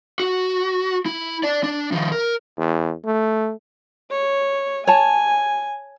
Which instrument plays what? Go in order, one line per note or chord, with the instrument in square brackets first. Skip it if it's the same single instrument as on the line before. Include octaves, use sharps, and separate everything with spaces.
[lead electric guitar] F#4
E4
D5 A5
D4
D#3 F3
A#4
[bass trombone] E2
A3
[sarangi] C#5
[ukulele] C#5 A5 [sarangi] G#5